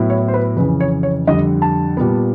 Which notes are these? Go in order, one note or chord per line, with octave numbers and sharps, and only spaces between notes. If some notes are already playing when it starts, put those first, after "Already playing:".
Already playing: A2 F#3 B3 E4
C#5
C5
B4
F2 C#3 E3 B4
C#5
C#5
F2 D3 G3 D#5
A5
A#2 G3 B3